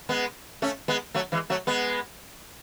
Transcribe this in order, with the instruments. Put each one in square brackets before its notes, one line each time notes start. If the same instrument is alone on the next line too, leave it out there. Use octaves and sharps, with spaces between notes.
[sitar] G#3 B3
A3 C#4
G#3 B3
F#3 A3
E3 G#3
F#3 A3
G#3 B3